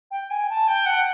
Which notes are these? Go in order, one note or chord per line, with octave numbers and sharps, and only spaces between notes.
G5
G#5
A5
G5
F#5